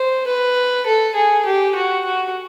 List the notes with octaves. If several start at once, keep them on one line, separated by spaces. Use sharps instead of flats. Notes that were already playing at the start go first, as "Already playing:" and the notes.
Already playing: C5
B4
A4
G#4
G4
F#4
F#4